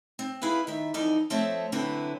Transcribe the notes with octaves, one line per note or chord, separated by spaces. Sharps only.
C4
E4 G#4 B4 F5
D#3 E5
F2 E3 D#4 D5
F3 A3 C4 C5 C#5 E5
D3 F#3 C4 E4 B4